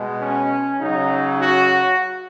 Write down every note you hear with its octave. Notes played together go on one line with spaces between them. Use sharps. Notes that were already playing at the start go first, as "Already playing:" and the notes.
Already playing: B2 G#3
C#4
C#3 F#3 D#4
F#4